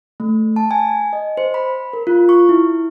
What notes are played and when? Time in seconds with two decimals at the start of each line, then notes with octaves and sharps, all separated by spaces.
0.20 A3
0.56 A5
0.71 G#5
1.13 D#5
1.37 C5
1.54 B5
1.93 A#4
2.07 F4
2.29 C#6
2.49 E4